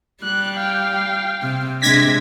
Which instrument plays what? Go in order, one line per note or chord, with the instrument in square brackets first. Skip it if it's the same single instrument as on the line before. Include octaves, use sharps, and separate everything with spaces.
[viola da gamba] G3 [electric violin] F#6
[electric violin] F5 G5
[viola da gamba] C3
[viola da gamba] C3 G#3 D4 [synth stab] G#6 A#6 B6